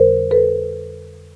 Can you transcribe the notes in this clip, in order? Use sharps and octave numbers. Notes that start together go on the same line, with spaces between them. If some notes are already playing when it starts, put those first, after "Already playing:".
Already playing: F2 D3 G3 A#4 C5
A4 B4